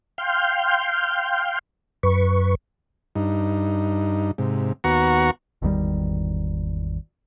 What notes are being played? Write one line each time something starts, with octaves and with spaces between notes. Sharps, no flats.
F5 G5 C6 F6 G6
F#2 B4 C#6
G2 D#4
G#2 C3
D#2 B3 F#4 F#5 A#5 C#6
G#1 E2 D#3 G3